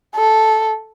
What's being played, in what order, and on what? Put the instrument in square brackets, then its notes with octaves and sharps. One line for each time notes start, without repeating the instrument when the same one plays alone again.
[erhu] A4